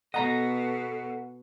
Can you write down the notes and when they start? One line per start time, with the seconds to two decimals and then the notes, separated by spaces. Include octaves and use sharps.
0.14 B2 B3 A4 D#5 F#5 A#5